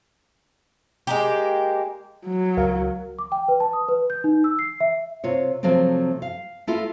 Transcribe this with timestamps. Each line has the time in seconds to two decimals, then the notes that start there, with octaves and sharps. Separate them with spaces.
1.07 G#3 A#3 G4
2.26 F#3
2.57 C#2 A#4 F5
3.19 D6
3.32 G5
3.48 B4
3.60 A5
3.73 D#6
3.88 B4
4.10 G6
4.24 D#4
4.44 E6
4.59 C7
4.81 E5
5.24 C3 F4 C#5
5.63 C3 F3 F#3 A3 C4
6.22 F5
6.67 A3 E4 F4 A4 A#4